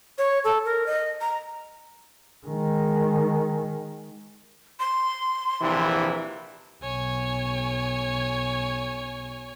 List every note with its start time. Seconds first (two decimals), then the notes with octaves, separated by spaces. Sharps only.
0.18 C#5
0.44 A4
0.66 A#4
0.86 D#5
1.21 A#5
2.46 D#3 G#3
4.80 C6
5.62 A#1 C3 E3
6.83 B1 C#5 G#5